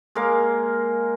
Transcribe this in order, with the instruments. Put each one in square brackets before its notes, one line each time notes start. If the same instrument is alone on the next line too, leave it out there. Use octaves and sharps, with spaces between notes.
[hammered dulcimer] G#3 A#3 A#4 F5